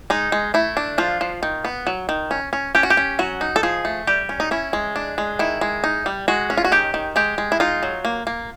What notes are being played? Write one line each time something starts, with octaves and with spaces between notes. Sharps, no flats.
G#3 D#4
G#3
A3 E4
D4
F3 F4
F3
D#3
B3
F#3
D#3
C#4
C#4
C#4 G4
F#4
G4
C#4
F#3 F#4
D#4
A4
F3 G#4
A3
G3 G4
C#4
D#4
C#4 E4
G#3
D4
G#3
D#3 E4
G#3
D#4
G3
G#3 F#4
C#4
F4
F#4
D#3 G4
D#3
G#3 G4
G#3
E4
D#4 F4
F#3
A#3
A#3